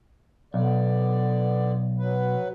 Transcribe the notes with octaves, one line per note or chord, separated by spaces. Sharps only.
B1 D3 B3 D5
F#3 B4